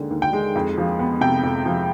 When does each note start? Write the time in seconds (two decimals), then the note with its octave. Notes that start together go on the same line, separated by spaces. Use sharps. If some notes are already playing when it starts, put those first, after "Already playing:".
Already playing: D#2 D3 G#3
0.11 D#2
0.22 G5
0.33 G#3
0.55 F2
0.78 F3
0.99 B3
1.21 C3 G5
1.43 F2
1.66 F3